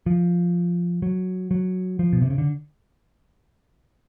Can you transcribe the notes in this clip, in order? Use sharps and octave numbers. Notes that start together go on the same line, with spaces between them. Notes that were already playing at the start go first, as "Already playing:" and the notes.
F3
F#3
F#3
F3
B2
C3
C#3
D3